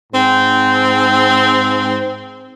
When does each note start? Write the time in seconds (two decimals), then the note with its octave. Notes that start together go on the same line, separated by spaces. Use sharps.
0.13 G#2 C4